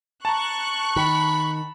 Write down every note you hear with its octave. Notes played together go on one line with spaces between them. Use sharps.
A5 A#5 C#6 F#6
D#3 B5